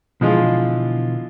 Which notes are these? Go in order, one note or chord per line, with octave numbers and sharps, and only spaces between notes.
B2 D3 E3 F3 G#3 F4